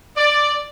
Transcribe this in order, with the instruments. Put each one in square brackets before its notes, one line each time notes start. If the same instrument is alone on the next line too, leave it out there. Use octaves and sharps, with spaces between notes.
[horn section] D5